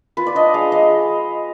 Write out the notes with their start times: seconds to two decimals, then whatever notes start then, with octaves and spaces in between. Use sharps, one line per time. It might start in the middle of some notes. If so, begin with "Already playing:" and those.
0.17 F4 B4
0.27 D5
0.35 D4 D#5
0.54 G#3 F5
0.72 G#3 D#5
0.90 G#3